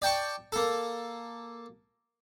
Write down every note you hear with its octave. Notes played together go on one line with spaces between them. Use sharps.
D5 G5 A5 C#6
A#3 A4